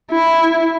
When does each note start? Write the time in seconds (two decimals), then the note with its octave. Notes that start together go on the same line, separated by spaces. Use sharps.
0.11 E4